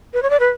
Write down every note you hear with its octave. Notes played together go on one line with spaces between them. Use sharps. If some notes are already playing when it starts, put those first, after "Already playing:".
B4
C#5
D5
B4